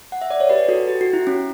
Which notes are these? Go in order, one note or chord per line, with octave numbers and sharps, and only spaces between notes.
F#5
E5
D5
C#5
G4 B4
F#4 A4
G4
F#4
E4
C#4